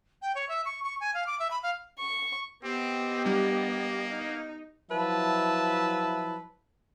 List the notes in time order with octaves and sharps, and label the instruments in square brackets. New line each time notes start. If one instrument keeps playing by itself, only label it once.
[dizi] G5
C#5
E5
C#6
C#6
G#5
F5
D6
E5
B5
F5
[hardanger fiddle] C#6
[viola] B3 D#5 [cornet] C4 [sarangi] G4
[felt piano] G3 D4 [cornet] A#3
[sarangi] D#4
[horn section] F3 F#3 E4 B4 E5 A5